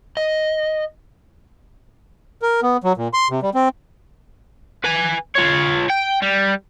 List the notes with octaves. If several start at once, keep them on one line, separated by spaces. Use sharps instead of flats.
D#5
A#4
B3
F#3
A#2
C6
C3
G3
C4
B4 G#5
F4 C#5
G5
G3